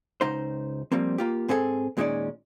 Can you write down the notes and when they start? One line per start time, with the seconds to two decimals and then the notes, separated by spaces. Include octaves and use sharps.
0.21 C#2 D#4 C5
0.92 F3 G3 A#3 C4
1.18 A#3 F4 G4
1.48 G#2 C4 G#4 A4 C5 G#5
1.97 D#2 A#2 G#3 C#4 D#4 D5